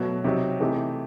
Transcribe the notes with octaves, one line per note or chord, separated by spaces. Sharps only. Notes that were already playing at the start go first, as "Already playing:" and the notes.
Already playing: B2 F#3 A3
C3 F#3 C4 D#4 G4
C3 E3 A3 D#4 G4